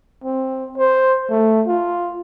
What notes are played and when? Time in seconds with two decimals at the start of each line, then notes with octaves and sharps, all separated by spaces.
0.25 C4
0.78 C5
1.30 A3
1.67 F4